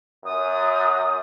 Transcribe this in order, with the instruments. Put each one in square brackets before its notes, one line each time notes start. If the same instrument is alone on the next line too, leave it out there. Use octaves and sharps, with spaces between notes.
[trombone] F#2 [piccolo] D#6